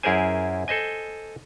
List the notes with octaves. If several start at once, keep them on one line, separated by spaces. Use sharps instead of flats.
F#2 E4 G#4 A#4 C5 G#5
A4 C5 D#5 G#5